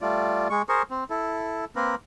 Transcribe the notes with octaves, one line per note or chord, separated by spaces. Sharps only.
G3 A3 F4 D5
G#3 C#6
G#4 A#4 C5 C#6
C4
E4 A4
A#3 C4 A#4 B4